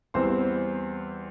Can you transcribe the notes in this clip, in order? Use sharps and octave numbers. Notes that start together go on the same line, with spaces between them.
E2 E3 G3 C4 C5 C6